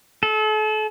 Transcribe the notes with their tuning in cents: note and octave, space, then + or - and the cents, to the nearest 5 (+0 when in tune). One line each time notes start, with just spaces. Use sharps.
A4 -35